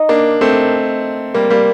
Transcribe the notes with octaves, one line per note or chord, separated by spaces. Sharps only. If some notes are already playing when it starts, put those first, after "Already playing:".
Already playing: D#4 D#5
A#3 D4
A3 C4
G3 A#3
G3 A#3